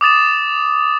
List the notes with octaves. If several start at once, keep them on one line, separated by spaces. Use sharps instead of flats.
D6 D#6 A6 E7